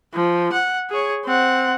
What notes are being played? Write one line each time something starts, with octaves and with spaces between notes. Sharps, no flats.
F3
F#5
G#4 C#5
C4 F#5